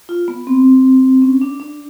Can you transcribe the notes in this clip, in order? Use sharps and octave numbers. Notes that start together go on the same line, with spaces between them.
F4
B3
C4
C#4
D4
D4